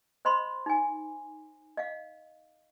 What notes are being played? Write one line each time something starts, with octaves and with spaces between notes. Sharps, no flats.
C5 D#5 B5 C6
D#4 G#5
D#5 F5